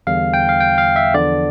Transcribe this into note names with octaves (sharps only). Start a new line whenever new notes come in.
E2 D3 G3 F5
G5
F5
G5
F5
E5
E2 D3 F3 D5